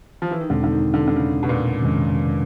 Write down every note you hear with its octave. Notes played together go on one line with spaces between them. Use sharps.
F3
E3
D#3
E2 B2 D3 G#3 C4 D#4
D3
D#3
D3
D3
C#3
B2
A#2
F2 C3 D#3 G#3 C#4